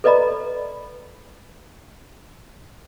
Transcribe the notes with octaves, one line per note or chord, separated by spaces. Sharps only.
A4 B4 D5 D#5 A#5 B5